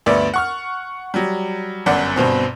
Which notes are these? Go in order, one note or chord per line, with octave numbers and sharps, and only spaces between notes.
D2 G2 B3 D5 E5
F#5 C#6 F6
F#3 G3
G1 F#2 D5 F#5 F#6
G1 G2 B2 C4